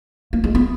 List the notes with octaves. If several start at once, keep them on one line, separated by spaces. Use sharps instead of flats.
A#3
G#3
B3